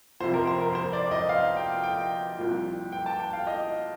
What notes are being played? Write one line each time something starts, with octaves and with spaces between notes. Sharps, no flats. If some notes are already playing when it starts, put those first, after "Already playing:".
F2 C3 F3 C5
A#4
C5
A#4
C5
D5
D#5
F5
G5
G5
C2 A#2 F3
G5
A5
G5
F5
D#5